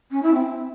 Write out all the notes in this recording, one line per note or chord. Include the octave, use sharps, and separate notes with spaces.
C#4
E4
C4